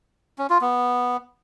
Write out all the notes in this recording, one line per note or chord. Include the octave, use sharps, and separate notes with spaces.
C#4
F4
B3